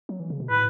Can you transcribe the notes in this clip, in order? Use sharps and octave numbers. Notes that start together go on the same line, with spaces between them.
F#3
E3
C#3
B2
A2 B4